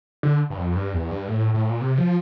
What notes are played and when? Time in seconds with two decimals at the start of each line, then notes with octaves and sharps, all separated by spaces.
0.23 D3
0.50 G2
0.58 F2
0.76 G2
0.94 E2
1.11 G2
1.28 A2
1.54 A2
1.70 A#2
1.81 C3
1.98 F3